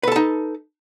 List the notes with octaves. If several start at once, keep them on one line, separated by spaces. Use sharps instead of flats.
D#4 A4 B4 A5